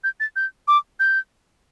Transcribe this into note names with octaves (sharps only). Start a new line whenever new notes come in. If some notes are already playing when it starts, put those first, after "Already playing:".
G6
A6
G6
D6
G6